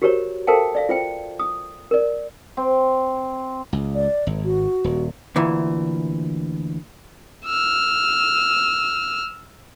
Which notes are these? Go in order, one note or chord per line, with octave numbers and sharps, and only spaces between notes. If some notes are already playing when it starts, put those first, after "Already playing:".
F#4 G4 A#4 C5 C#5 A#5
A4 A#4 C5 F5 G5 A5
D5 E5 F5
F4 C5 G5
D#6
A#4 D5
C4
C#2
D5
G#1
F#4
D#1
D2 A#2 E3
E6 F6